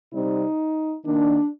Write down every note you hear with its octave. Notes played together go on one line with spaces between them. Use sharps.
C3 G3 C4 D#4
D#3 A#3 D4